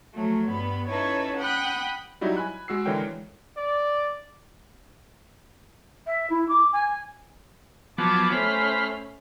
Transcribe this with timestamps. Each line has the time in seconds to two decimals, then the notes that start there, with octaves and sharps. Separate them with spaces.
0.14 F3 F#3 A3
0.48 G2 B3 B5
0.88 C#4 D#4 E4 A4 B4 C#5
1.37 F#5 G5 B5 D#6 F#6
2.21 F#3 G3 D#4 E4 F#4
2.37 G#5 B5 F#6
2.68 G#3 F#4 E6 C7
2.86 D3 E3 G#3 A#4 C#5 G5
3.57 D5
6.06 E5
6.30 E4
6.48 D6
6.72 G#5
7.98 F3 F#3 B3 A5 D6
8.32 A3 C#4 C5 B5 F6